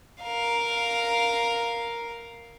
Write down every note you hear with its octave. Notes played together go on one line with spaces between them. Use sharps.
A#4 F5